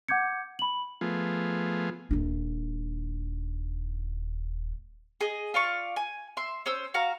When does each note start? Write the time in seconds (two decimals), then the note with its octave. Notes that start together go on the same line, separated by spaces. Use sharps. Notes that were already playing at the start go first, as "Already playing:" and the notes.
0.08 F#5 D6 G6 G#6 C#7
0.59 B5 F#7
1.01 F3 A3 B3 F4 G#4
2.11 D#1 D4
5.21 G#4 D#5
5.54 F4 D5 F5 C#6
5.96 G#5
6.37 E5 C6
6.66 C#4 C5 E6
6.94 F#4 F5 A#5